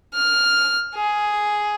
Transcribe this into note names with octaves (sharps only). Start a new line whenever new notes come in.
F6
G#4